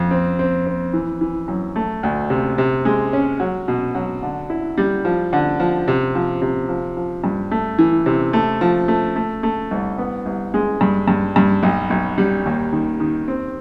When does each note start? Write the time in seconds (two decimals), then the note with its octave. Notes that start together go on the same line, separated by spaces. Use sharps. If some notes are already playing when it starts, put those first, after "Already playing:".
Already playing: F2
0.11 C4
0.39 C4
0.67 C4
0.93 E3
1.21 E3
1.48 F#2
1.76 A3
2.03 D2
2.30 C3
2.58 C3
2.85 G#3
3.13 C#4
3.40 F#3
3.68 B2
3.95 F#3
4.23 D3
4.50 E4
4.78 G3
5.05 F3
5.33 D3
5.60 F3
5.88 C3
6.15 F3
6.42 C3
6.69 F3
6.97 F3
7.24 G2
7.51 A3
7.78 E3
8.06 C3
8.33 A3
8.61 F3
8.88 A3
9.16 A3
9.43 A3
9.71 C2
9.98 B3
10.26 C2
10.54 G#3
10.81 G2
11.08 G2
11.36 G2
11.63 B1
11.90 B1
12.18 G3
12.46 D#2
12.72 D#3
13.00 D#3
13.28 C4